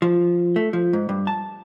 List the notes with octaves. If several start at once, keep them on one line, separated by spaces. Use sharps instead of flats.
F3
A3
F3
G#2
G2
A5